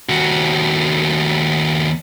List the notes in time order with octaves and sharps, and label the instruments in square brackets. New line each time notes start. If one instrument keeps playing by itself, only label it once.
[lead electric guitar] D#2 F#4